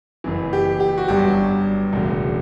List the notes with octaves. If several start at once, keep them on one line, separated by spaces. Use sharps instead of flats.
F#1 F#2 E3
G4
G4
F#4
G1 G2 F#3 G4
E1 D2 C#3